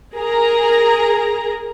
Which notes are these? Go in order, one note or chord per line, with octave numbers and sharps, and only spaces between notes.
G#4 A#4 A#5